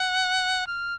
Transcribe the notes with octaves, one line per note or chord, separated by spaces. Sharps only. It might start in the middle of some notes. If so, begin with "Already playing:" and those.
Already playing: F#5
F6